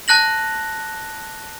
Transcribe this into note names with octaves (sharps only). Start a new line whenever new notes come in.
A5 F#6 A#6 F#7